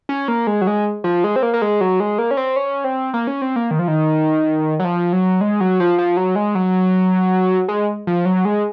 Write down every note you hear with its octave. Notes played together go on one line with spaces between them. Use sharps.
C#4
A#3
G#3
F#3
G#3
F3
G#3
C4
A#3
A#3
G#3
F#3
G#3
A#3
C#4
C4
C#4
C4
A#3
C#4
C4
A#3
D#3
F3
D#3
F#3
F3
F#3
G#3
F#3
F3
F3
F#3
G#3
F#3
G#3
F3
F#3
G#3